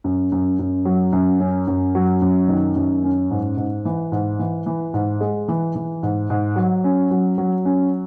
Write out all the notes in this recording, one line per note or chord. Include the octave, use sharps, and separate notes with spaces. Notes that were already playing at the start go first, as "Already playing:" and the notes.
F#2
F#2
F#2
F#3
F#2
C#4
F#2
F#3
F#2
D#3
F#2
C#4
G#2
G#2
E3
G#2
E3
E3
G#2
G#3
E3
E3
G#2
G#2
F#3
C#4
F#3
F#3
C#4